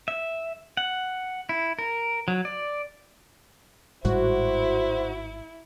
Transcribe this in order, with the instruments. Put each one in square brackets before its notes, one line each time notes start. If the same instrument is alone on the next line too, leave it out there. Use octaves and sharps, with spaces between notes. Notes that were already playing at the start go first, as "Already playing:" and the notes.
[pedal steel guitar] E5
F#5
E4
A#4
F#3
D5
[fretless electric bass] G#1 A2 G3 [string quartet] E4 [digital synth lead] F#4 [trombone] C5